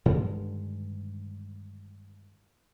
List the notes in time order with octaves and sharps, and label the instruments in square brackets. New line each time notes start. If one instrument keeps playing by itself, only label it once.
[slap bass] G2 D3 D#3 G#3